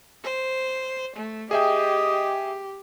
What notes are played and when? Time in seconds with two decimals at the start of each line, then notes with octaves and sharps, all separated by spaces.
0.24 C5
1.17 A3
1.51 G4 G#4 D#5 E5 G5